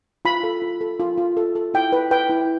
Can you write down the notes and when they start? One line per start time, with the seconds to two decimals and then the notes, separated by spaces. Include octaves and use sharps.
0.25 F4 B5
0.43 A4
0.62 F4
0.81 A4
1.00 F4
1.18 F4
1.37 A4
1.55 A4
1.74 E4 G5
1.92 B4
2.11 B4 G5
2.30 E4